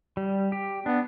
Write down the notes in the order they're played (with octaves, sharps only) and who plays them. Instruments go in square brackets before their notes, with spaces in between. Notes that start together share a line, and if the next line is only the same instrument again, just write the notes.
[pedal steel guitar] G3
G4
[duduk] B3 [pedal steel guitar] D4